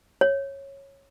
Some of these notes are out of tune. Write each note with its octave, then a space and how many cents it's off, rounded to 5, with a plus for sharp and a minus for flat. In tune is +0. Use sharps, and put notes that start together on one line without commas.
C#5 -10